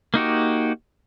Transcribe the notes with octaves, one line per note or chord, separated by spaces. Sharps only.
A#3 D#4 F#4 G4